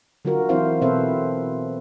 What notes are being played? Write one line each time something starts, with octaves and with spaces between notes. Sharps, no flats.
D3 F#3 F4 F#4 A#4
E3 C4 E4 A#4 C5 F5
B2 C4 A4 B4 C5 E5